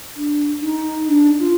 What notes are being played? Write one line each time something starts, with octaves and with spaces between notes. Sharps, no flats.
D4
D#4
D4
F4